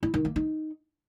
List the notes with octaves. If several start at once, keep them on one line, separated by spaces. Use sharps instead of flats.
E4
D#3
A#3
D#4